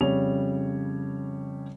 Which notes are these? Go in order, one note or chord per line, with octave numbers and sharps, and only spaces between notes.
F2 C#3 G3 C#5 F7